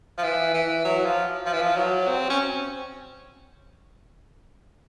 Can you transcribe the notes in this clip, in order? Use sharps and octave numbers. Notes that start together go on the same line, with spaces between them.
F3
E3
E3
F#3
F3
F3
E3
F3
F#3
C4
C#4